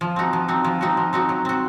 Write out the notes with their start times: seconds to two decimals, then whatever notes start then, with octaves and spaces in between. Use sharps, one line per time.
0.01 F3
0.16 C4 D#4 F#4
0.33 F3
0.48 C4 D#4 F#4
0.64 F3
0.81 C4 D#4 F#4
0.97 F3
1.13 C4 D#4 F#4
1.29 F#3
1.45 C4 F#4